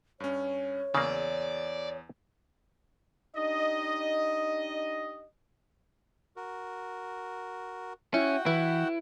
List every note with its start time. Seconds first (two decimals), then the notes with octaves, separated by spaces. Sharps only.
0.20 G2 C#4 C#5
0.95 E2 C#3 A#3 G#4 D5 E6
3.36 D4 D#4 G4 D#5
6.36 F#4 A#4
8.14 C#4 E4 F#4 E5 F#5 G5
8.46 E3 E4 B4